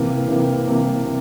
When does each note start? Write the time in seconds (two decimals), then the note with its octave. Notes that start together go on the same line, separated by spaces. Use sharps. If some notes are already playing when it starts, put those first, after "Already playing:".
Already playing: C3 E3 A#3
0.28 C3 E3 A#3
0.67 C3 E3 A#3
1.06 C3